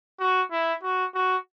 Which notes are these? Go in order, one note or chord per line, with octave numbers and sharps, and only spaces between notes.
F#4
E4
F#4
F#4